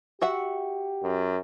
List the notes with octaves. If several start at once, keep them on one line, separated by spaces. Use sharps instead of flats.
F#4 G4 E5 F#5
F#2